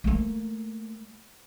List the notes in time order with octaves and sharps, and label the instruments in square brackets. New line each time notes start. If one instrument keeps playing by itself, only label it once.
[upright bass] A3 A#3